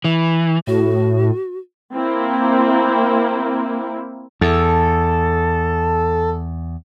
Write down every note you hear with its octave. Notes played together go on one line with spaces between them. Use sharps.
E3
A2 F#4
A#3 C4 E4
E2 A4